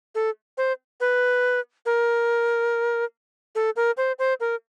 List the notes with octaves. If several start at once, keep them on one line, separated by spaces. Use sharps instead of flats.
A4
C5
B4
A#4
A4
A#4
C5
C5
A#4